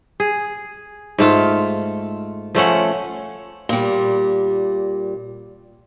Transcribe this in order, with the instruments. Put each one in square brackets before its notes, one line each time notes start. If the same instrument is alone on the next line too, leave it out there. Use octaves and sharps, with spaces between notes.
[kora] G#4
G#2 A3 F4
F3 A3 C#4 F#5
[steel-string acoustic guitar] A#2 G3